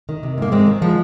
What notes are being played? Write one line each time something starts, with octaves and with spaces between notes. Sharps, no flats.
D#3
C3
G#2 A#3
G#2 G#3 C4
D#3
F3 G#3